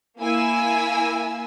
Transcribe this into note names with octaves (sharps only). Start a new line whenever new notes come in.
A#3 E4 G#5 E6